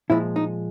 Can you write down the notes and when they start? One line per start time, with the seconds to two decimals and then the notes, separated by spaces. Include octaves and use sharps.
0.10 A#2 F3 G#3 E4
0.36 D#4